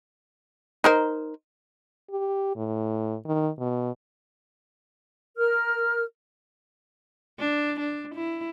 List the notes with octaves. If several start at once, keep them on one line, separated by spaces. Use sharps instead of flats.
D#4 A#4 C5
G4
A2
D#3
B2
A#4 F6
D4
D4
E4